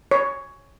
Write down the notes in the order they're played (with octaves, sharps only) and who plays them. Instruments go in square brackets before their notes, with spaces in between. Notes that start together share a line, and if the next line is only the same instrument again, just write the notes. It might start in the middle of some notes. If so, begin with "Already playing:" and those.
[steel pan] C#5